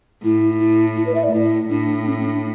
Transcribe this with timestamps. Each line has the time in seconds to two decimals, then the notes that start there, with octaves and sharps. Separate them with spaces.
0.24 A2 E4
0.60 E4
0.97 E4
1.06 B4
1.15 E5
1.23 D5
1.33 A2 E4
1.69 A2 D4
2.06 C#4
2.24 D4